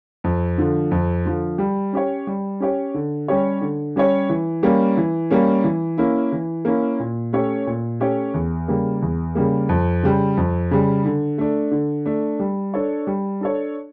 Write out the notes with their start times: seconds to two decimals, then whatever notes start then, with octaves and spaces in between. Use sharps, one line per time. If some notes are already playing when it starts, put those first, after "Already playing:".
0.24 F2
0.58 D3 F3
0.91 F2
1.25 D3 F3
1.58 G3
1.93 C#4 G4 C#5
2.27 G3
2.60 C#4 G4 C#5
2.94 D3
3.28 G3 C#4 G4 C#5
3.61 D3
3.96 G3 C#4 G4 C#5
4.29 E3
4.63 G3 A#3 C#4
4.97 E3
5.31 G3 A#3 C#4
5.64 E3
5.98 A#3 C#4 E4
6.32 E3
6.65 A#3 C#4 E4
7.00 A#2
7.33 A3 C#4 G4 C#5
7.67 A#2
8.00 A3 C#4 G4 C#5
8.34 E2
8.68 C#3 G3 A#3
9.02 E2
9.35 C#3 G3 A#3
9.69 F2
10.03 C#3 G3
10.37 F2
10.71 C#3 G3
11.05 D3
11.38 A3 D4
11.71 D3
12.06 A3 D4
12.40 G3
12.74 D4 A4 C#5
13.07 G3
13.41 D4 A4 C#5